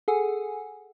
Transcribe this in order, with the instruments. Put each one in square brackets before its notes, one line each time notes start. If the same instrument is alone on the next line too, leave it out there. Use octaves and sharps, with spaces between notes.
[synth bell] G#4 A4 F#5 G#5